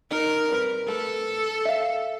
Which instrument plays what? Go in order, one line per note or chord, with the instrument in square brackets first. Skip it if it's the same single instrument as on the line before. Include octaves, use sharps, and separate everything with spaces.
[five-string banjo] D#4 [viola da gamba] A#4
[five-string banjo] G3 C4 B4
[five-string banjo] A3 B4 [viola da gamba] A4
[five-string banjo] E5 F5